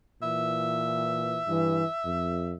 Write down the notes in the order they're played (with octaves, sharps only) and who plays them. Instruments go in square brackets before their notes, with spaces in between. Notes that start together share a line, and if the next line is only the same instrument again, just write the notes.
[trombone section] A#2 E3 [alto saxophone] E5
[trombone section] G2 E3
F2